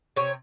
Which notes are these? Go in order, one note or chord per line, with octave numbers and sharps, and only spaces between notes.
C3 C#5